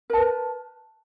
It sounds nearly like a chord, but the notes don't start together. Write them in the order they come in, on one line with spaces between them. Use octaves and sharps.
A#4 A5 B4